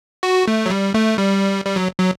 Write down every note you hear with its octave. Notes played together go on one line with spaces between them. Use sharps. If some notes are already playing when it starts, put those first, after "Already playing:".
F#4
A3
F#3
G3
A3
G3
G3
F#3
F#3